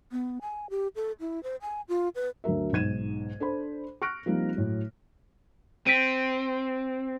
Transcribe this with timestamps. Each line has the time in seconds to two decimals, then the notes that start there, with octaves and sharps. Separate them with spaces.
0.12 B3
0.41 G#5
0.70 G4
0.96 A4
1.20 E4
1.43 C5
1.62 G#5
1.89 F4
2.15 B4
2.44 D2 F#3 A3 A#4 E5
2.72 B1 G#2 G#6 D#7 E7
3.40 D4 A4 C5 B5
4.02 C#6 F6 F#6 A#6 D7
4.26 F3 G3 A#3 C4 D#4
4.56 A2 F#3
5.87 C4 B6 D7 D#7